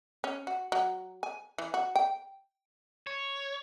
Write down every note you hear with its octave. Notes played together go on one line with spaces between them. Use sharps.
C#4
F#4
F#3
G#5
E3
F#4
G5
C#5